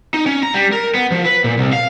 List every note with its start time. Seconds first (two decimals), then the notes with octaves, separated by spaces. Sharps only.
0.14 D#4
0.26 C#4
0.43 A#5
0.54 G3
0.73 A#4
0.95 B3
1.12 F3
1.25 B4
1.44 A#2
1.58 C2
1.73 F5